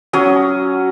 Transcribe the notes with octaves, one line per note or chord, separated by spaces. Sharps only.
F#3 C#4 D#6